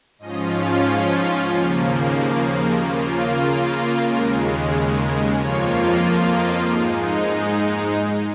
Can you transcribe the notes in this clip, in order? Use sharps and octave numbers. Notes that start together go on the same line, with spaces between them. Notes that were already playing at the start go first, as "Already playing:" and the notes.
G#2 F3 C#4 F4 D#5
C#5
D#2 C#3 F3 A#3
C#3 A#3 F4 C#5
A#4
A#4
A#4
D#2 C#3 G#3 A#4
C#5
A#4
F2 F3 A#3 F4 C#5
D#5
G#2 G#3 D#4
G#5
A#5